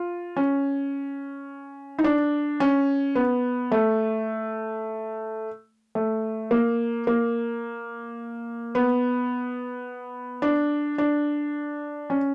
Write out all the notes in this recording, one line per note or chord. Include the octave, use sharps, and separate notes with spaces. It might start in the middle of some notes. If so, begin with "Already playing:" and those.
Already playing: F4
C#4
D#4
D4
C#4
B3
A3
A3
A#3
A#3
B3
D4
D4
C#4